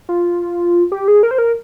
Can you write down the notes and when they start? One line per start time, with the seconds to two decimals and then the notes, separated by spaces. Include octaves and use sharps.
0.09 F4
0.92 G4
1.08 G#4
1.23 A#4
1.31 C5
1.38 A#4